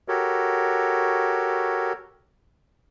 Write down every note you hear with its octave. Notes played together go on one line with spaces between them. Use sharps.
F#4 G4 A4 A#4 C#5